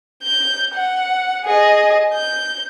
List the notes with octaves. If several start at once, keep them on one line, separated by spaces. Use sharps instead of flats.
G6
F#5
G#4 D#5
G6